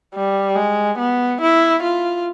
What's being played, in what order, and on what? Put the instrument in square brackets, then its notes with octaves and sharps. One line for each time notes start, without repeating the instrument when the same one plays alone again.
[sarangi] G3
G#3
B3
E4
F4